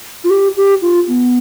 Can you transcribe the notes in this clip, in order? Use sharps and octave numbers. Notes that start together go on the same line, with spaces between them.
F4
G4
G4
F4
B3